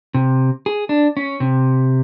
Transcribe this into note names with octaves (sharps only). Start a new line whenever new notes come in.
C3
G#4
D4
C#4
C3